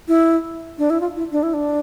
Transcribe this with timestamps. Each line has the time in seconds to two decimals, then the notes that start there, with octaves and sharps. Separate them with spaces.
0.08 E4
0.78 D4
0.90 E4
1.01 F4
1.16 E4
1.32 D4
1.43 E4
1.54 D4